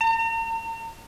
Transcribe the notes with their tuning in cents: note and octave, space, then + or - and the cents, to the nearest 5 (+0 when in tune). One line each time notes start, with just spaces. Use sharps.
A#5 -40